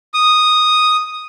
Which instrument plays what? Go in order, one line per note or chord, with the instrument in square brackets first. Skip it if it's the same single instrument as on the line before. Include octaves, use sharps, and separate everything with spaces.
[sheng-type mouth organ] D#6